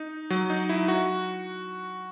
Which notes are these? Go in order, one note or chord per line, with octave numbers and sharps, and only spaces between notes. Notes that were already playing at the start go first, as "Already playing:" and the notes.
Already playing: D#4
F#3
D#4
E4
F#4